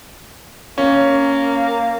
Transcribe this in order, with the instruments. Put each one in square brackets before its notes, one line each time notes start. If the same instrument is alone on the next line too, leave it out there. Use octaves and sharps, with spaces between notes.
[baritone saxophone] A#3 [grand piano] C#4